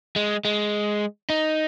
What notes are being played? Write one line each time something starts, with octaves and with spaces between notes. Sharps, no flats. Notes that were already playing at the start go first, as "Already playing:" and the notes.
G#3
G#3
D#4